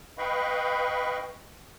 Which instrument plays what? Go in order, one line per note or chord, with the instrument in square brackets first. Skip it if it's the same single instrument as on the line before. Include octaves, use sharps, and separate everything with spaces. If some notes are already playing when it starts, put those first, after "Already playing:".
[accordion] B4 D#5 F5 G5 B5 C#6